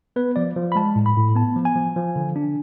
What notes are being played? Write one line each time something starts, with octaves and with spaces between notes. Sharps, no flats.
B3 B4
F3 D5
F3
B5
G#3 A5
A2
B5
A2
B3 A5
F3
G#5
F3
F3
D3
D4